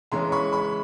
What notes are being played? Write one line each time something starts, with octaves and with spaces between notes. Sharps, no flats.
C#3 E3 G#3 C#4 A#5 C6
B5 C#6
B5 C#6